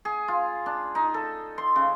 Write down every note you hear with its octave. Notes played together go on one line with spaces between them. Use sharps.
G#4
F4
D4
D#4
A4
C6
C#3